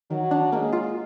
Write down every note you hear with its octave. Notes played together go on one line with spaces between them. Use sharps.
D#3 F#3
D4
G#3 A#3
F4